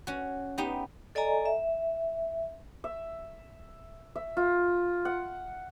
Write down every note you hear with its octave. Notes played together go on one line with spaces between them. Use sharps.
C#4 F#4
B3 D#4 G4
A4 D5 D#5 G#5 A#5
E5
E5
E5
F4
F#5